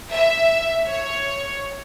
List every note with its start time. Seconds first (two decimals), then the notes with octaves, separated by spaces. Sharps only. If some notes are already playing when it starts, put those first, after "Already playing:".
0.11 E5
0.89 C#5